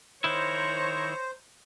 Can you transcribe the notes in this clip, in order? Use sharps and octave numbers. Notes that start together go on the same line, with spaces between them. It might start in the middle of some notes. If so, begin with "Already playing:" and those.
D#3 E4 C5 C#5 A#5